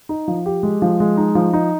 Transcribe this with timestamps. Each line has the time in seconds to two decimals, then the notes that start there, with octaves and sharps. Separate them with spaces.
0.09 D#4
0.28 F3
0.46 G4
0.63 G#3
0.82 F3
1.00 G#3
1.17 D#4
1.35 F3
1.53 D#4